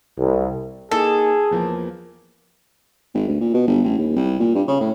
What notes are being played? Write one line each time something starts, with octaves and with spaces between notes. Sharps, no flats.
C2
A#3 D#4 G#4 A4
E2 F3 A#3
G#1
D2
A#2
B2
G1
A1
D#2
C2
A#2
G2
C#3
A2